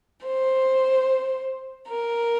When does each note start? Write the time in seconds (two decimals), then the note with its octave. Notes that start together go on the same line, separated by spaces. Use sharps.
0.24 C5
1.87 A#4